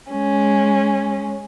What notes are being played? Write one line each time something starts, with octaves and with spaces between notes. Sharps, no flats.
G#3 C#4